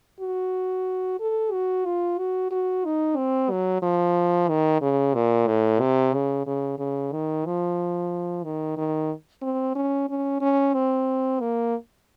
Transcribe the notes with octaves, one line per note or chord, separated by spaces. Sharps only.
F#4
A4
F#4
F4
F#4
F#4
D#4
C4
F#3
F3
D#3
C#3
A#2
A2
C3
C#3
C#3
C#3
D#3
F3
D#3
D#3
C4
C#4
C#4
C#4
C4
A#3